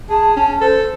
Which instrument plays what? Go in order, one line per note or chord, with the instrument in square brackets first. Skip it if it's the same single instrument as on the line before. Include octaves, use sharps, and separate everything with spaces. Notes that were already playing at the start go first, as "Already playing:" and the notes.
[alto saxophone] G#4 [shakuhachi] A5
[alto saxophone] C#4
[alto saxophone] A4 [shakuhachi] C5